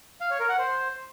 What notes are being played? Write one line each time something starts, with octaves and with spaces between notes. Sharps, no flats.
F5
C#5
A#4
F#5
C5